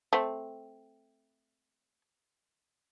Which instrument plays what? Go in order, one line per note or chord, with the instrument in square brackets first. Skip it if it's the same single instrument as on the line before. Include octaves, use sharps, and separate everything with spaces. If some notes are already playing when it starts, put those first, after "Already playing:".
[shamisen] A3 C4